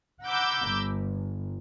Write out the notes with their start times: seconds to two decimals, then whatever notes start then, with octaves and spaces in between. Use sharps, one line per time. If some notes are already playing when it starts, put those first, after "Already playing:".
0.24 F#5 A#5 B5 D6 E6 G6
0.71 G1